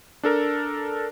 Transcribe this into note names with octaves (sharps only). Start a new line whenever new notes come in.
D4 A4 A#4